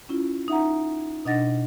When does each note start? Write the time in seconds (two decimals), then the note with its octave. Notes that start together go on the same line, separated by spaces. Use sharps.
0.09 C#4 E4 F4
0.48 D#4 E5 F#5 A#5
1.25 B2 D4 D#5 F#5 A6 A#6